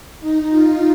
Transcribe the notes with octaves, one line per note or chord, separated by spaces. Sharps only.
D#4
F4